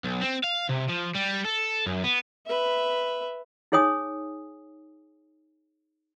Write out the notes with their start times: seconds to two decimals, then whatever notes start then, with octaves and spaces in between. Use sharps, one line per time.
0.05 B1
0.22 C4
0.44 F5
0.69 C3
0.89 F3
1.15 G3
1.46 A4
1.86 F#2
2.04 B3
2.47 B4 E5
3.72 D#4 G#4 C#5 G#5 D#6